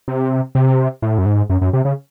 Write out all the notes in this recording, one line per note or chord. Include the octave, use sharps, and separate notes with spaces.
C3
C3
A2
F#2
G#2
F#2
F#2
C3
C#3